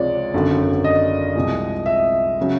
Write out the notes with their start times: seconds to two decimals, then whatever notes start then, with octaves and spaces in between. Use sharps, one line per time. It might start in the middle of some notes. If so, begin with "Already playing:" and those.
Already playing: C#2 C3 F3 G#3 C#5 D5
0.34 G#1 F#2 D3 F#3
0.84 D#5
1.36 C2 C3 F3 G#3
1.86 E5
2.41 C#3 F#3